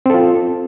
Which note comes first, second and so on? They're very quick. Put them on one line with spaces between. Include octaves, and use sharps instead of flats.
C4 A4 F4